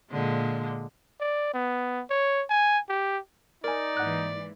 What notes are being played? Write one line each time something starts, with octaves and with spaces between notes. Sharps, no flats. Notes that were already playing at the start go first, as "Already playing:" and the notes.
A#2 D3 G#3
D5
B3
C#5
G#5
G4
D#4 A#4 D5 G#5
G#2 E3 A#3 F#5 F#6